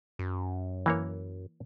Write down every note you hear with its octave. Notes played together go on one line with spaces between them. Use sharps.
F#2
E3 A#3 C#5